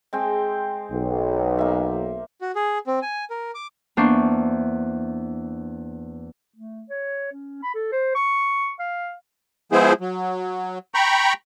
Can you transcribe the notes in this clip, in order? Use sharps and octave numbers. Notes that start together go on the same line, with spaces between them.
G#3 C4 G5
B1
A#3 E5
F#4
G#4
C4
G#5
A#4
D6
E2 A#3 D4 C5 C#6
A3
C#5
C#4
B5
A4
C5
C#6
F5
F3 G#3 B3 E4 G#4 C5
F#3
G5 A#5 B5 C#6